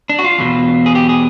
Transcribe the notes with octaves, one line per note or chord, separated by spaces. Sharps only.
D4
F#4
F4
E2 B2
G#4
G4
G#4